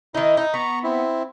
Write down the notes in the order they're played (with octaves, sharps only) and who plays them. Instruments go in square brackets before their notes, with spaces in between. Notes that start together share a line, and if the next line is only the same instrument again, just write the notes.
[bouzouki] D#3 D#4 [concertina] E4
[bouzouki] D#4
[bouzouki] B3 [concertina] A#5 C#6
[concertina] C4 E4